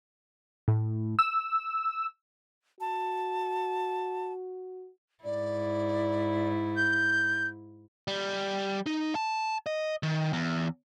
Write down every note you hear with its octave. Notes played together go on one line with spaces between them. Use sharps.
A2
E6
F#4 A5
G#2 E4 D5
G6
G3
D#4
A5
D#5
D#3
E2